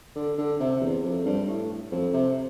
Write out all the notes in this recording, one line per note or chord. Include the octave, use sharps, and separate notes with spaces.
D3
D3
C3
E2
F2
G2
A2
F2
C3